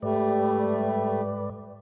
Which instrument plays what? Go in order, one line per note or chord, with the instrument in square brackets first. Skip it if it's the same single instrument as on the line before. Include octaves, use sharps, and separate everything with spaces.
[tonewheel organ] G#2 B4 D5 [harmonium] G3 A3